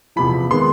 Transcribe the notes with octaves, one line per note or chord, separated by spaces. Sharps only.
E2 C3 F3 B5
D#3 G#3 B3 C6